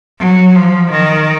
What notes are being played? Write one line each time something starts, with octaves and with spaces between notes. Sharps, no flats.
F#3
F3
D#3